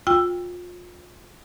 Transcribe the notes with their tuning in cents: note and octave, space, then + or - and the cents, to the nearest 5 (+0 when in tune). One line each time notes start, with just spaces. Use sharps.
F4 +30 G5 +15 E6 +10